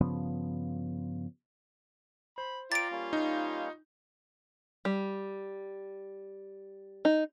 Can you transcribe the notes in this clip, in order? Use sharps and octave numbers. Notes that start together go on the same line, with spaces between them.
G2 C#3 F3 B3
C5 B5
F4 D5 G5 A#5 A6 D7
G3 A#3 C#4
D#4
G3
D#4